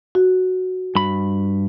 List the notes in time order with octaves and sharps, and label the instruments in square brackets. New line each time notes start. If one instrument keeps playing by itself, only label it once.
[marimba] F#4
[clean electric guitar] G2 B5